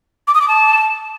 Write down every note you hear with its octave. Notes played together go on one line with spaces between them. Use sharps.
D6
D#6
D6
A5